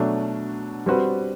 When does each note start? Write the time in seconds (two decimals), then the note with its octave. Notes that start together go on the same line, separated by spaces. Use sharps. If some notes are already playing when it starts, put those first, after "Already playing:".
Already playing: B2 F#3 A3 D4
0.86 G3 C4 F#4 B4